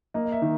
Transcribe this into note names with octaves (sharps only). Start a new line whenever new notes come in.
A#3 D#5
D#5
E5
D#3